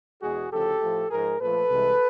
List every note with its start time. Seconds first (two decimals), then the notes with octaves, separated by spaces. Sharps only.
0.22 E2 B2 G#3 F#4 G#4
0.51 D2 C#3 F3 G4 A4
0.81 A2 F3 A3
1.10 G#2 F3 G#3 G#4 A#4
1.40 A#2 F3 A3 A4 B4
1.70 C2 C3 E3 G#3